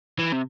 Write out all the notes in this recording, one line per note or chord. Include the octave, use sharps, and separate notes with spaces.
E3
C3